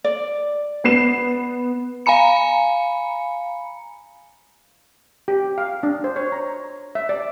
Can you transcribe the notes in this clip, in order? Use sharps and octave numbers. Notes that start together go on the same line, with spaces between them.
D5
B3 C7 E7
F5 G#5 A#5 B5 C#7
G4
F5
D4
C5
C#5
A#5
E5
D5